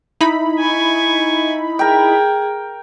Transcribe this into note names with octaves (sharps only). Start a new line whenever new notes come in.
D#4 E4 B5
G#5 C#6
G#4 A#4 G5